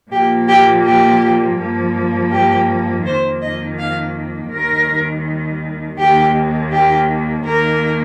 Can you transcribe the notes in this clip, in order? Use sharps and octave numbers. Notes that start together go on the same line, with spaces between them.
A#2 F3 A#3 G4
G4
G4
G2 F3 A#3
G4
F2 D#3 A#3 C5
D#5
F5
D#2 D#3 G3 A#4
D#2 D#3 A#3 G4
G4
D#2 D#3 A#3 A#4